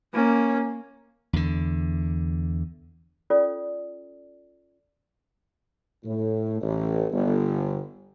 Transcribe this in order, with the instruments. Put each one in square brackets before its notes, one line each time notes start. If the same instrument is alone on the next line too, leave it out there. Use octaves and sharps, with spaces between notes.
[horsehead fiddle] A#3 C#4
[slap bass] E2 D3
[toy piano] C#4 F4 A4 D5
[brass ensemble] A2
A1
G1